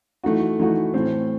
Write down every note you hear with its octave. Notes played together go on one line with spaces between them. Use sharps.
E3 A3 D#4 F#4
E3 A3 D#4 F#4
A2 E3 A3 C4